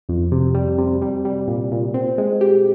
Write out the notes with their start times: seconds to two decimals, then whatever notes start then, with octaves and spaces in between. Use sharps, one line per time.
0.09 F2
0.32 C3
0.55 G3
0.78 C3
1.02 G3
1.25 G3
1.48 A#2
1.72 A#2
1.94 C4
2.18 G#3
2.41 G4